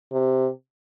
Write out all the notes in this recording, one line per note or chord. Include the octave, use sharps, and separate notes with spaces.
C3